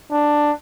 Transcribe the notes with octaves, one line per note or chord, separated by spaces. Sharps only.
D4